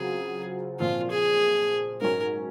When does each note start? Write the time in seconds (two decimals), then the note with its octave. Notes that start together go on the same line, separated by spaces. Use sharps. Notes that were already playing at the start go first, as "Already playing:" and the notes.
Already playing: C#3 F#3 C4 F4 G#4
0.80 A#2 F3 C4 F4
1.11 G#4
2.01 G#2 F#3 C#4 A#4